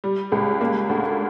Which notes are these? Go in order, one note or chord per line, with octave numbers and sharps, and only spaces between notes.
G3
C#2
A#3
D2